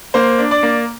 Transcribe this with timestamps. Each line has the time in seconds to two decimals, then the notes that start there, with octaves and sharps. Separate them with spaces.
0.14 A#3 C5
0.38 D4
0.51 D5
0.63 A#3